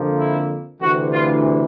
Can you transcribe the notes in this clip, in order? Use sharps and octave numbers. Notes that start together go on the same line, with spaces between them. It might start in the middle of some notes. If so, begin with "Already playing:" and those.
Already playing: F2 D3 F3 A#3
E4
D2 C3 E3 F#4
F4